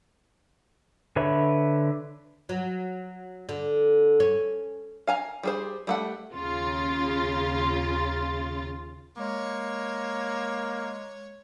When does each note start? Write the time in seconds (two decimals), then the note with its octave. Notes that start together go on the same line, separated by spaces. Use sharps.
1.16 D3 B4 C#5 E5 B5
2.49 F#3
3.49 D3
4.20 C#4
5.07 F5 G#5 A#5
5.43 G3 G#4 C5
5.87 G3 A3 F#5
6.35 D#2 C#3 F4 A6
9.17 G#3 A#3 C#5